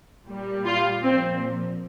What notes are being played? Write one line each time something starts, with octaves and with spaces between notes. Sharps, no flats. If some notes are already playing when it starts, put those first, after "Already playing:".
A#2 G3
F4
A#2 F3 C4